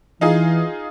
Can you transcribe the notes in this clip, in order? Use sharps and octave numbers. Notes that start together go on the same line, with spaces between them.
E3 D#4 F4 G#4